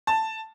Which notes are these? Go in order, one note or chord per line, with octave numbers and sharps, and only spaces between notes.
A5